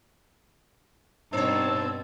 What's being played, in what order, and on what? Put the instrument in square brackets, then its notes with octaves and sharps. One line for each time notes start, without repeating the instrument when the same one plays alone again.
[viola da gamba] G2 B2 C4 [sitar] B3 C#5 [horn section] D#4 A5 [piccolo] E6